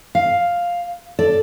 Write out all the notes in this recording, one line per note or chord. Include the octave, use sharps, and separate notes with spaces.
F5
A4 D5